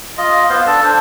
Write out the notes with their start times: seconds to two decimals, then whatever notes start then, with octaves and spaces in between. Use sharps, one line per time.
0.17 F4 D#5
0.50 B3 F4 C5 F5
0.67 D4 A4 A5
0.84 D4 C5